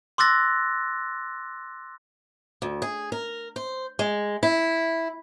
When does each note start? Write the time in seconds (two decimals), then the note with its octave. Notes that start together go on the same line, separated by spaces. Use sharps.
0.18 C6 D6 E6 F#6 A6 A#6
2.62 D2
2.82 G#4
3.12 A#4
3.56 C5
3.99 G#3
4.43 E4